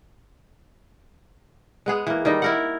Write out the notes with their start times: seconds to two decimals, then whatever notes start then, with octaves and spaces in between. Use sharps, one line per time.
1.86 G#3 B3 G#4
2.07 E3 A#3
2.25 D#3 G3 D#4
2.42 E4 A#4 F#5